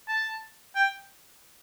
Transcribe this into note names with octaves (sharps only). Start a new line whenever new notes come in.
A5
G5